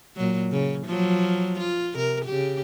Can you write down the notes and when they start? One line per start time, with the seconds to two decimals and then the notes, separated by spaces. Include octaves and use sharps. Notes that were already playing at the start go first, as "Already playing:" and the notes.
0.16 A#2 F#3
0.52 C#3
0.87 F3 F#3
1.60 F4
1.94 C3 A#4
2.25 C#3 G4